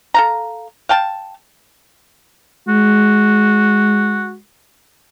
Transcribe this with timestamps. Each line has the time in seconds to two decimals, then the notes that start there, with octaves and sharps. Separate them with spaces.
0.14 A4 F5 A#5
0.89 F5 G5 A5
2.68 G#3 F#4